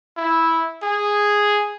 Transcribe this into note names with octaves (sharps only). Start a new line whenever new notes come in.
E4
G#4